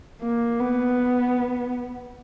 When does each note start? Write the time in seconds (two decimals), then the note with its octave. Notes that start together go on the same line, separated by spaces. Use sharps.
0.22 A#3
0.59 B3